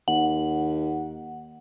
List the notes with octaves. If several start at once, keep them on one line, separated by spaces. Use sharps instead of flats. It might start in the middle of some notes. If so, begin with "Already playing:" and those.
D#2 F#5